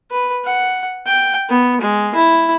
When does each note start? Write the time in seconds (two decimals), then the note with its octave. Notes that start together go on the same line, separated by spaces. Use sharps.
0.11 B4
0.45 F#5
1.06 G5
1.50 B3
1.81 G#3
2.15 E4